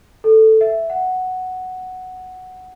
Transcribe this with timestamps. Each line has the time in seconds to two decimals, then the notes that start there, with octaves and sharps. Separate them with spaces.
0.24 A4
0.61 E5
0.90 F#5